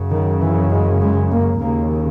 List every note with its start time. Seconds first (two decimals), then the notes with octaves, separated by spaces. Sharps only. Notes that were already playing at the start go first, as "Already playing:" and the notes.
Already playing: F#2 C#3
0.10 D#3
0.41 E3
0.70 G#3
1.00 G#3
1.31 A#3
1.61 D#2 C#3 A#3